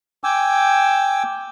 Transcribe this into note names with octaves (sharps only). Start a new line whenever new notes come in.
G5 G#5 D6 E6